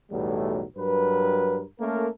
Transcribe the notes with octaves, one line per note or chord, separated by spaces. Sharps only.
B1 E2 A2 F#3 G3 A3
G2 F#3 A#4 B4
A3 A#3 C#4 A4 A#4